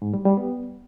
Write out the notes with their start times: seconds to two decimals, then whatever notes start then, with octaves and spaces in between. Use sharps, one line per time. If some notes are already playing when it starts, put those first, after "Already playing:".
0.02 G#2
0.14 G3
0.25 G3
0.37 B3